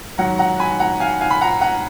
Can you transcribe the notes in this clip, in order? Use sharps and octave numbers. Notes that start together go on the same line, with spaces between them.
G#2 D#3 F#3 F#5 A#5
F#5 A#5
G#5 B5
F#5 A#5
F5 G#5
F5 G#5
B5
F#5 A#5
F#5 A#5